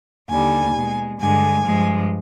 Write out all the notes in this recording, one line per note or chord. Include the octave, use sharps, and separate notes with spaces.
D#2 D3 G3 G#5
B2 G#3
G2 D3 G#3 G#5
G2 F3 G#3